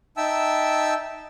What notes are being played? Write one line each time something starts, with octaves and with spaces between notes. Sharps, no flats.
D#4 E5 G5 A5 E6